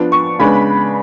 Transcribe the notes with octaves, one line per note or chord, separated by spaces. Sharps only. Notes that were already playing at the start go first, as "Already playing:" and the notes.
Already playing: F3 B3 D4
C#6
C#3 G#3 B3 D4 B5